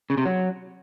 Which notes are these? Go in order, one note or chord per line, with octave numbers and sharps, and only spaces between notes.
C#3
C3
F#3